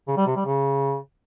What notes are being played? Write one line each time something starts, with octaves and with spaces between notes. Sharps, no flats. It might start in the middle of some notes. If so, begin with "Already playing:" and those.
C#3
G3
C3
G3
C#3